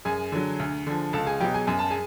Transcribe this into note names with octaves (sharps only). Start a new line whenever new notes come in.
F#2 G#4 G#5
D3 F#3
D2
D3 F3
C#2 A4 A5
G#4 G#5
B2 F#3 G4 G5
G#4 G#5
F#2 G#5
A5
G#4 G#5